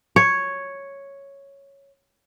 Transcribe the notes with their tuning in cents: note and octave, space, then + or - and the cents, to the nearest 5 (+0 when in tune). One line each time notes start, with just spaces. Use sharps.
C#5 +0